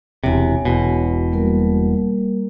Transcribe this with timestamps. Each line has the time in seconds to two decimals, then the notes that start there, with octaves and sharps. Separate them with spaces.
0.24 E1 C3 C#5 G#5
0.65 E1 B2
1.32 G3 A#3 A#4